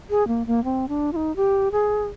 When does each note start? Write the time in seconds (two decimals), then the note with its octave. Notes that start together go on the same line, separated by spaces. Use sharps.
0.10 G#4
0.27 A#3
0.47 A#3
0.64 C4
0.88 D4
1.13 F4
1.16 D#4
1.36 G4
1.72 G#4